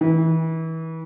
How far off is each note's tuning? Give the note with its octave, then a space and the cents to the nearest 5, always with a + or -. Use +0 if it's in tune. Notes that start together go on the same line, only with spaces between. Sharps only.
E3 -30